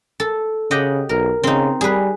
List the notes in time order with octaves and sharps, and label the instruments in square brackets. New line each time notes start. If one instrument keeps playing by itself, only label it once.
[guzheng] A4
[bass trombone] C#3 [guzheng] G4 D#5 F#5
[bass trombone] B1 [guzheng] A#4
[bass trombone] C#3 [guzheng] C4 D#4
[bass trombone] G3 [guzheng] G#4 B4